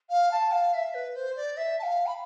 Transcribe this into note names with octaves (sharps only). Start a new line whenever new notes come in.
F5
A5
F5
E5
B4
C5
D5
E5
A5
F5
B5